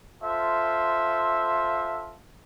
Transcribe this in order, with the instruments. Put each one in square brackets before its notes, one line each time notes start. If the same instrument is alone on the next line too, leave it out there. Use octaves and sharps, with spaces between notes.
[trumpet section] F4 A4 C5 E5